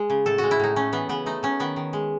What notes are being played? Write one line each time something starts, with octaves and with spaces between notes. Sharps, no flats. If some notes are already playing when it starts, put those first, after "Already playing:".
Already playing: G#3
C#3
A2 A4
G#3 F#4
E4
A2 D#4
A3 C#4
E3 B3
C#3 B3
A3 D#4
F#3 C#4
D#3 B3
D#3
G#3